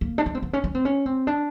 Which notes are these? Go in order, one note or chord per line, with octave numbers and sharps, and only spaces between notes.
A#3
D4
C#4
C4
B3
C#4
C#4
C4
C#4
C4
D4